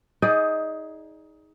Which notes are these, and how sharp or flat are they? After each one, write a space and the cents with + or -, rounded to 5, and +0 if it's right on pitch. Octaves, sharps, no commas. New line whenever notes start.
D#4 +20 G#4 +0 D5 +0